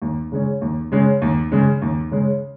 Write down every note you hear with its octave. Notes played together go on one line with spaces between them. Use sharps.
D#2
C#3 G#3 C#4
D#2
C#3 G#3 C#4
D#2
C#3 G#3 C#4
D#2
C#3 G#3 C#4